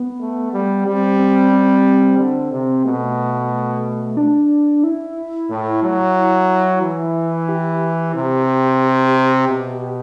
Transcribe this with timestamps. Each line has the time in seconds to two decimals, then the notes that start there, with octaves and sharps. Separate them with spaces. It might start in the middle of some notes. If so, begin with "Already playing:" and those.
Already playing: B3
0.20 A3
0.53 G3
0.85 G3 C4
1.19 C4
1.53 C4
2.19 D3
2.51 C3
2.85 B2 A3
4.17 D4
4.84 E4
5.50 A2
5.83 F#3
6.82 E3
7.49 G4
8.15 C3
9.48 B2